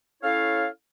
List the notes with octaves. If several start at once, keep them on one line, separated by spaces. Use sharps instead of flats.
C#4 E4 A4 C#5 F5